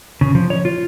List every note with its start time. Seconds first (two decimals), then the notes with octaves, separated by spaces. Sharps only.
0.21 C#3
0.35 F3
0.50 C#5
0.65 F4